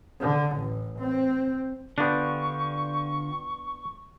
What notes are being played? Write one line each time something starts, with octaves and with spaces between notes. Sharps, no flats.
D3
A1
C4
D3 B3 D4 F4 G4 C#6